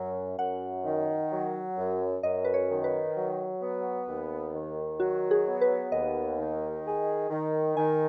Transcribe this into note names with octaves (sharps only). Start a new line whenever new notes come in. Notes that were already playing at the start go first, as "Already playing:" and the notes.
Already playing: F#2 F#3
F#2 F#5
D#3
F#3
F#2
F#2 D#5
B4
C#5
D#3
B4
F#3
B3
D#2
D#3
F#3 F#4
G#4
B3
B4
D#2 D#5
D#3
G#4
D#3
D#3 G#5